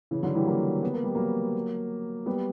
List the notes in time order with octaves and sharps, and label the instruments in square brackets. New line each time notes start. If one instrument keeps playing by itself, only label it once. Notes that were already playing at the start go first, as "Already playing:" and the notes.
[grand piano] C#3 E3
D3 F#3
E3 G3
F#3 A#3
B3
A#3
G3
F#3 A#3
G3 B3